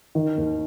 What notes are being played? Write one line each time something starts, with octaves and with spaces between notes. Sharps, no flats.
D#3
D#2